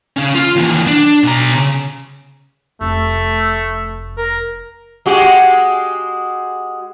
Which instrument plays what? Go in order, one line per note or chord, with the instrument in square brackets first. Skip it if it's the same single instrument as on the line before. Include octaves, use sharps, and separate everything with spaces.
[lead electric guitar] C#3 C#4
F4
D#2 E3
D4
B2 A#5
C#3
[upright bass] F1 [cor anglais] A3
[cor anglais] A#4
[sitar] G#3 F#4 G4